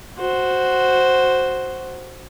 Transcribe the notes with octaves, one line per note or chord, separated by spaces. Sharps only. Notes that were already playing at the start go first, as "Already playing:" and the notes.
F#4 C5